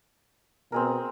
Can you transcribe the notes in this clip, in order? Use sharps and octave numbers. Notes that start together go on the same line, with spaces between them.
B2 C4 G#4 A#4